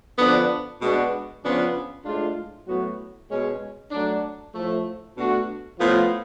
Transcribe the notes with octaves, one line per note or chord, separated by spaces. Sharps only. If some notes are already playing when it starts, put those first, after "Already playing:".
D3 F3 B3 D4
B2 G#3 B3 D4 F#4
C#3 F3 B3 D4 F4
A2 G#3 D4 F4
A2 F#3 B3 F#4
B2 G#3 C#4
F#3 A3 D4
A2 F3 A3
B2 A3 D4 F#4
A2 F3 B3 F4